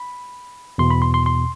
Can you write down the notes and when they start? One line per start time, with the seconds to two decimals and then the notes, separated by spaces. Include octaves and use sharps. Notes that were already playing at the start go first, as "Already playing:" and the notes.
Already playing: B5
0.78 E2 B2 C6
0.91 B5
1.02 C6
1.14 C6
1.26 C6